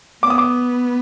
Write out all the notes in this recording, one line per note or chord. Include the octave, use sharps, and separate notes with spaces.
B3 D6
D#6
D6